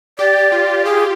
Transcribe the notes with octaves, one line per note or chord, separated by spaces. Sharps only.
G4 D5
F4
G4 G#4